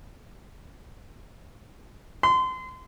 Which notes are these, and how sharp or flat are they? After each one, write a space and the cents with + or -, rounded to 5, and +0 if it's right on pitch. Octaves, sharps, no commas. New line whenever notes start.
C6 -30